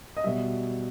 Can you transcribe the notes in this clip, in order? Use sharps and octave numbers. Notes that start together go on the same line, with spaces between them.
D#5
B2 G3 E5